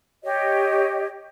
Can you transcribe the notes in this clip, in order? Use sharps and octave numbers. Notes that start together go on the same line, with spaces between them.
G4 C#5 D#5